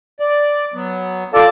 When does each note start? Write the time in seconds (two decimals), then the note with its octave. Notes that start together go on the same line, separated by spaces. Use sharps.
0.20 D5
0.74 F#3 B3
1.34 F4 A4 D5 A5